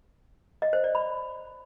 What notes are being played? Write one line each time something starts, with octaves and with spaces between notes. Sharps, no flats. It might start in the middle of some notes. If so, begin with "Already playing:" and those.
D#5
C5
D5
B5